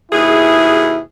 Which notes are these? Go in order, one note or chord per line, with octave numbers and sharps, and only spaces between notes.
D#2 B2 E4 G#4